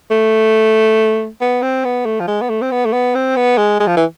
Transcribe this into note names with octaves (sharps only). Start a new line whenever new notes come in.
A3
B3
C4
B3
A3
F3
G#3
B3
A3
C4
B3
A3
B3
C4
B3
G#3
G#3
F3
E3